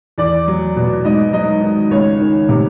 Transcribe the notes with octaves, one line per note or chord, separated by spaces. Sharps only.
E2 D5
F#3
B2
G#2 D#5
F#3 D#5
D#3
C#2 C#5
D#3
C3